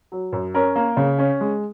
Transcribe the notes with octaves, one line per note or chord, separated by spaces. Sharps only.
F#3
F#2
C#4 A#4
A#3
C#3
C#4
G#3